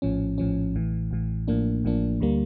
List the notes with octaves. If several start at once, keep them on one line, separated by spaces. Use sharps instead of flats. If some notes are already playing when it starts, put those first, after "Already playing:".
A#1 A2 F3 C#4
A#1 A2 F3 C#4
A1 A2 E3
A1 A2 E3
A1 A2 F3 A#3 D4
A1 A2 F3 A#3 D4
D2 D3 G3 A#3